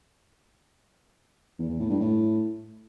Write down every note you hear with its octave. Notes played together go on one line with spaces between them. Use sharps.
E2
E2
A2
G2
A2